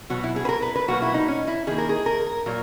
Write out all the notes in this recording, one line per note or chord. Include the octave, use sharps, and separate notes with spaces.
B2 F#3 B3 F#4
E4
G#4
B4
A#4
B4
B4
B2 F#3 A#3 F#4
E4
D#4
C#4
E4
D#3 A#3 G#4
A#4
G#4
A#4
A#2 F#3 A#3